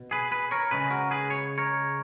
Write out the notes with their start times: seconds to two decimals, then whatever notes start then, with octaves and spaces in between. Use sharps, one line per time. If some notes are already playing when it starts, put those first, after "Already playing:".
Already playing: B2
0.11 G#4 B4
0.31 G#4 B4
0.51 A#4 C#5
0.71 C#3 G#3 G#4 B4
0.90 F#4 A#4
1.11 G#4 B4
1.30 C#5
1.58 A#4 C#5